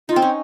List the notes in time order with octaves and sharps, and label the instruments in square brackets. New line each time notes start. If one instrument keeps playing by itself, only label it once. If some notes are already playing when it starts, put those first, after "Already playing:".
[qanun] D#4 [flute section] F4
[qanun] C4
C#4